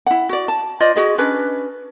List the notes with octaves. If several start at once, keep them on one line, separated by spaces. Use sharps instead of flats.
E4 F#5
F#4 D5
A5
F4 C5 D5 D#5
F#4 G#4 D#5
C#4 D4 B4